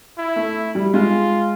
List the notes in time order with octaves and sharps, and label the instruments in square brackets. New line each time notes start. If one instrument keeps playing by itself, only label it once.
[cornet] E4
[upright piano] A3
G3
[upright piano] G#3 [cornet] F4